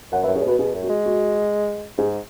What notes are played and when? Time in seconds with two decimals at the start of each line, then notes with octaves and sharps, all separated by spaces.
0.12 F#2 C#5 F#5
0.23 B4 E5
0.28 F#2
0.35 G#4 C#5
0.43 B2 F#4 B4
0.59 B2 G#4
0.74 F#2
0.83 F#4
0.89 G#3
1.06 F#4
1.98 G#2 G#4